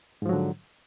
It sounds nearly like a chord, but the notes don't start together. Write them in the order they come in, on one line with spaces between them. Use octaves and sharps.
G#2 F3 F#3 D3